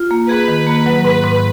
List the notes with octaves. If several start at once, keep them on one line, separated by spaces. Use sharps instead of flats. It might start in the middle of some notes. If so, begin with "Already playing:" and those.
Already playing: F4
A#3
G#4 B4
D#3
A#3
F#3
G#2 B4
G#2